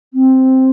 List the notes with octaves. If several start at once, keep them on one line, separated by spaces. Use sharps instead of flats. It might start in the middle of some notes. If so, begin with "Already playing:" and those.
C4